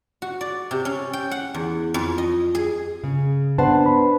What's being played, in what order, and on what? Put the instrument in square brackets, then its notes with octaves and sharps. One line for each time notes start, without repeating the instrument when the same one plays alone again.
[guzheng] F#4
D5
C3
C#4
G5
F#5
E2
F2
D#5
G#4
[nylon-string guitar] C#3
[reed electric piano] B3 F#5 A5 [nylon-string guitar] D4 B4 C5
[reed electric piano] B5